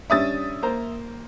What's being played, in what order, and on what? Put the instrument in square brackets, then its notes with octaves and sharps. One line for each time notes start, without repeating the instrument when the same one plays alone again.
[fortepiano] G3 C#4 D4 [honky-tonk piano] E5 D#6 A6
[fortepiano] A#3 C5 A#5